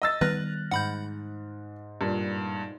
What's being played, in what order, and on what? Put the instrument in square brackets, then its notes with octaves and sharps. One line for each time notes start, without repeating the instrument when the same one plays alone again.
[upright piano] D#5 E6 A6
[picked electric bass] D#3 G3 B3 [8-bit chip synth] B4 [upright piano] F6 F#6 A#6
[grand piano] G#2 [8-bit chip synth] F#5 B5 G6
[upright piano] G2 A#2